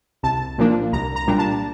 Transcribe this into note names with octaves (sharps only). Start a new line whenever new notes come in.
C2 A5
A#2 F3 A#3 D4
C2 A#5
A#5
A#2 G3 D4
A5